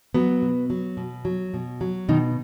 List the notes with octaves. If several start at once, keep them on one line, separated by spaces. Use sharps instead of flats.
F#3 B3
B2
F#3
B2
F#3
B2
F#3
B2 D#3 D#4